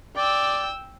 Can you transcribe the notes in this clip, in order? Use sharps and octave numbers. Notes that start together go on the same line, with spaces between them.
D5 G5 E6